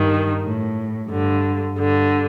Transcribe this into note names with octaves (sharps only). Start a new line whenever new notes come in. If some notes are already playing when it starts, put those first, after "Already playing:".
Already playing: G2 D#3
A2
G2 D3
G2 D3